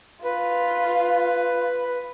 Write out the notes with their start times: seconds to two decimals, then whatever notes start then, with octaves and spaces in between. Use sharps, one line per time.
0.24 F4 B4